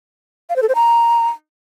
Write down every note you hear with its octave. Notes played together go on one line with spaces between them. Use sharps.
F5
C5
A4
C5
A#5